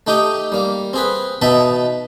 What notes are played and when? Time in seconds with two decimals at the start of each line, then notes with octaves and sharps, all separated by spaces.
0.07 A3 D#4 G4 G5 D#6
0.52 G3 A#3
0.93 C4 G#4 B4
1.42 B2 B3 D#4 D#5 E5 A5